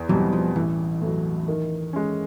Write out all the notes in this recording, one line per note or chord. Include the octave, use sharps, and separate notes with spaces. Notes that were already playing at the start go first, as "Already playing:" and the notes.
Already playing: E2
B2 E3 F#3 G3 C4
F3
A1 E3
A2 F#3
D#3
G#3 C#4